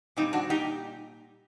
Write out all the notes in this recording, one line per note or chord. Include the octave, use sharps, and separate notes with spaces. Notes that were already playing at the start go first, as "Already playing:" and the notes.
A#2 G3 C4 D#4
D4 F#4
D#4 G4